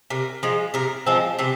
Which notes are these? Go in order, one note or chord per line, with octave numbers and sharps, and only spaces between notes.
C3 A#4
F3 G#3
C3 A#4
F3 G#3 C4
C3 C4